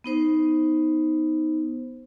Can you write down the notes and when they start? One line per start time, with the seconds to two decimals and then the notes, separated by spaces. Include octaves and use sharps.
0.04 B3 D#4 C5